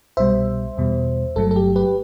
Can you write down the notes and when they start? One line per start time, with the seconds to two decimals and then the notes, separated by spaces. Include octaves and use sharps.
0.17 C2 B2 G3 C5 E5
0.78 E2 B2 G3
1.36 G1 G2 F#3 A3 A4
1.51 A4
1.56 G4
1.76 G4 B4